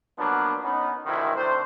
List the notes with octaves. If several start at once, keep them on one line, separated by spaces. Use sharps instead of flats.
F3 F#3 A#3 B3 D4
B3 C#4 D#4
G#1 D2 G2 C3 D#3 E4
C3 A3 D4 C5